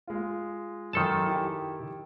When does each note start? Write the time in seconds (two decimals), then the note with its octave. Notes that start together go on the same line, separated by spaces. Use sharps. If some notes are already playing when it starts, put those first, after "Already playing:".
0.08 G#3 F4
0.93 F#2 D#3 A4 A5
1.27 E4 G4